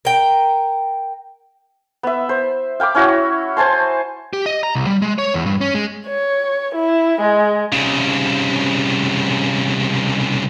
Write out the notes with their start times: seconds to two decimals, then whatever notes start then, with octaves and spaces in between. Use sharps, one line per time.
0.05 A#4 G5
2.03 B3 E5
2.29 C5
2.80 F5 G5 B5 D6
2.95 C#4 E4 F#4 C#5
3.57 C5 G#5 A5 C6
4.33 G4
4.46 D#5
4.63 A#5
4.75 C2
4.87 G3
5.02 G#3
5.18 C#5
5.34 E2
5.46 G2
5.61 C#4
5.74 G#3
6.07 C#5
6.75 E4
7.21 G#3
7.72 C2 C#3